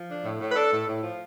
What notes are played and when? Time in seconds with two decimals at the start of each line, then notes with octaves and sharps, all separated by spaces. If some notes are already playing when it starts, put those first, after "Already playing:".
Already playing: F3
0.09 D4
0.25 A2
0.41 A2
0.51 B4
0.56 D4 A4
0.73 A2
0.87 A2
1.03 F3